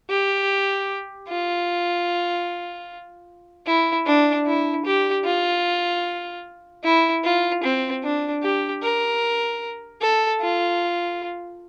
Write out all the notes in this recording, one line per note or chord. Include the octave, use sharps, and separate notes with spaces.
G4
F4
E4
D4
E4
G4
F4
E4
F4
C4
D4
G4
A#4
A4
F4